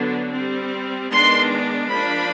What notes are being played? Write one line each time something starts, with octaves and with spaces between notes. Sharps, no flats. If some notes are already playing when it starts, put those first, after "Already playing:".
Already playing: D3 F#3 B3 D4
G3 C4
D#3 G#3 B3 D4 C6
F3 A#3 D4 B5